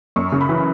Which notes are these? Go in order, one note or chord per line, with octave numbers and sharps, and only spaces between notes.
F#2 C#6
C#3
B5
E3